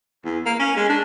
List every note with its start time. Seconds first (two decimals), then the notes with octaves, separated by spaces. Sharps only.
0.25 E2
0.46 A#3
0.60 C#4
0.76 G#3
0.89 D4